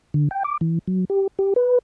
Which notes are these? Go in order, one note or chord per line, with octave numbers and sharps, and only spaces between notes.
D3
G5
D6
E3
F#3
G4
G4
B4